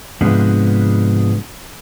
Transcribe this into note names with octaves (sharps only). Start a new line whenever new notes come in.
G#2 C3 F3 G#3 B3 D4